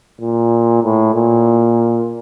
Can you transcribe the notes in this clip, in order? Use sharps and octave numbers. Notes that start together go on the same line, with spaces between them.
A#2
A2
A#2